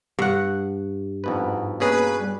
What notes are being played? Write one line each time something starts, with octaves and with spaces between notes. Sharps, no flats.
G2 F#5
F2 G#2 B2 B4
B2 A#3 C#4 G#4 B4
G3